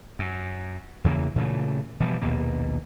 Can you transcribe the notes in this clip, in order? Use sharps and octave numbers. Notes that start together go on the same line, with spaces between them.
F#2
E2 C#3 E3 A#3
A#2 C#3 E3 A3
B2 E3 F3 G3
A#1 D#2 B2 A#3